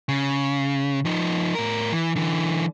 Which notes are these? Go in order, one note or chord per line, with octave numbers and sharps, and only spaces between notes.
C#3
F3 D#4
A2 A#4
E3
D3 E3